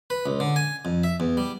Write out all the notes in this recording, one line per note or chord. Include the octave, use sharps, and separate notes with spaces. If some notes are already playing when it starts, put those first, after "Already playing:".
B4
C#2
D3
G#5
F2
E5
E2
G3